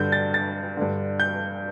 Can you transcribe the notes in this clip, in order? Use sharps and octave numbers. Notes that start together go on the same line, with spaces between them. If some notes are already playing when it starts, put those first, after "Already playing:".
Already playing: G2 D3 G6
A6
A6
G2 D3
G6